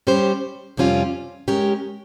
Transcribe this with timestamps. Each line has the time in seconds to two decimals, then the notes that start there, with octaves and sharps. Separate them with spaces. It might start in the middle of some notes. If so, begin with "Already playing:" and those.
0.07 G3 C#4 G4 C5
0.77 F2 C3 G3 C#4 F4
1.48 G#3 C#4 G4 A#4